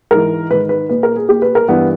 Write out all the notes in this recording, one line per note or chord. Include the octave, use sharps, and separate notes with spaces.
G#2 E3 A#4
G#2 D#3 B4
B4
A#2 B4
A#4
G#4
A#2 G4
B4
A#4
G2 E3 B3